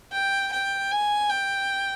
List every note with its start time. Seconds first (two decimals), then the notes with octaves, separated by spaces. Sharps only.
0.12 G5
0.52 G5
0.91 G#5
1.30 G5